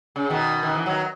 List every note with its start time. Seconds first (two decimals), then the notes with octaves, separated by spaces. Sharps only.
0.16 C#3
0.30 B2 D#3
0.63 D#3
0.75 E3
0.86 D#3 F#3